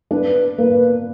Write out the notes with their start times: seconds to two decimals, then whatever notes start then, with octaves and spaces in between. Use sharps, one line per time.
0.11 D4 B4
0.58 A#3 B4